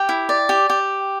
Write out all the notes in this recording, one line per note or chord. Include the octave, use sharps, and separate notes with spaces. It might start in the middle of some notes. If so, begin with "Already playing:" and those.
Already playing: G4 G5
E4
D5
G4
G4